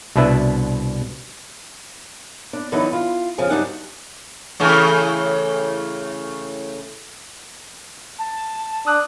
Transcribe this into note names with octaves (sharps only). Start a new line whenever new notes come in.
C2 B2 D4 E4 B4 E5
D4
D3 E3 F#3 B3 D#4 E4
F4
F2 C#3 F3 G#5
G2 F#3 D4 D#4 F#5
A2 C#3 E3
A5
D4 D#6 F#6